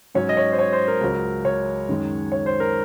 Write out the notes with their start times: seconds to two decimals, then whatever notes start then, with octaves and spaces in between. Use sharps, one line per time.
0.15 G#2 F#3 C#4 C#5
0.29 D#5
0.37 C#5
0.52 C5
0.59 C#5
0.73 C5
0.88 A#4
1.01 C#2 C#3 F#3
1.45 C#5
1.89 F#2 D#3 G#3
2.32 C#5
2.46 C5
2.60 A#4